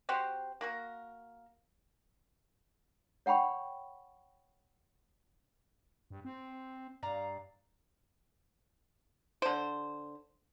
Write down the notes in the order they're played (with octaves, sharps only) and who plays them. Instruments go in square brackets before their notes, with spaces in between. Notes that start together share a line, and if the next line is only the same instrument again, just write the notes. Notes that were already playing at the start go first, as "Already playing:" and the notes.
[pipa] C4 F#4 G4 C5
A#3 F#4 A#4
[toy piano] C#5 F#5 G5 B5 C#6
[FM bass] G2
C4
[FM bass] G2 [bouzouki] D5 F5 A#5
[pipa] D3 C5